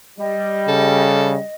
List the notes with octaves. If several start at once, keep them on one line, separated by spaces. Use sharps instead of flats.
G3 D#5
C#3 A4